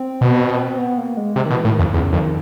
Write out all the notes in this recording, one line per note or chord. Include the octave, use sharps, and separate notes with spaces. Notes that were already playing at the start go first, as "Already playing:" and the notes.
Already playing: C4
B2
C4
B3
A#3
G#3
C3 G#3
D#3
B2 E3
A2 D#3
F2
E2 C#3
F2 D#3